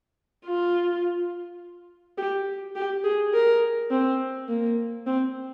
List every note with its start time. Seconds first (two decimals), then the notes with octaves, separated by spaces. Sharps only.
0.46 F4
2.17 G4
2.76 G4
3.04 G#4
3.34 A#4
3.90 C4
4.48 A#3
5.06 C4